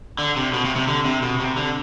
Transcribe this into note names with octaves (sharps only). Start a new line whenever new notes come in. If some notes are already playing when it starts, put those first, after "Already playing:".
D3
C3
B2
C3
C3
D3
C3
B2
C3
D3